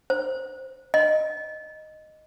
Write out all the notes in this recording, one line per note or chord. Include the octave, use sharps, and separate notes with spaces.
C5
D#5